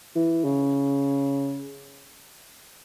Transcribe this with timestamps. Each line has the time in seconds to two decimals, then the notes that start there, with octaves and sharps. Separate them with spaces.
0.16 E3
0.44 C#3